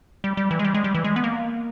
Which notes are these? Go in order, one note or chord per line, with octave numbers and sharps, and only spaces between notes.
G3
G3
E3
G#3
G3
G#3
G3
E3
G#3
B3
A#3